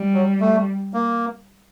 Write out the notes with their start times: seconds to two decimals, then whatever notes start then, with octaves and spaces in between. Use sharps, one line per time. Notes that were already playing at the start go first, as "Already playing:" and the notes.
Already playing: G3
0.14 F#3
0.40 A3
0.94 A#3